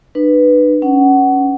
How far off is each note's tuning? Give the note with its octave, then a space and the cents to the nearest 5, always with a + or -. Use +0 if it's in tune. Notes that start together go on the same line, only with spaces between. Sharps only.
D4 +45 B4 +0
C#4 +0 F#5 +20